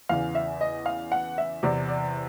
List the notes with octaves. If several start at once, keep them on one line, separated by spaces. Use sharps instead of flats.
E2 C#3 E3 F5
E5
D#5
F5
F#5
E5
E2 C3 E3 D5
D5